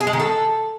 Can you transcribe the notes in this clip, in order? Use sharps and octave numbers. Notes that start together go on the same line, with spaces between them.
G#4
G#3
D#3
A4